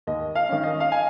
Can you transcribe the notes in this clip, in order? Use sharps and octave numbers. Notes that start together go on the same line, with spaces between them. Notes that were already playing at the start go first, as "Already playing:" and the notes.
D#2 D#5
F5
D#3 C#4
D#5
F5
G#5